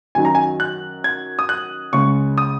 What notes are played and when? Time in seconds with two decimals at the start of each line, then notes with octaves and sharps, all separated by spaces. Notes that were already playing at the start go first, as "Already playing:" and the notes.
0.15 F#2 D#3 F#3 D#4 G#5
0.25 A#5
0.35 G#5
0.60 F#6
1.04 G#6
1.39 D#6
1.49 F#6
1.93 C#2 C#3 G#3 C#6
2.38 D#6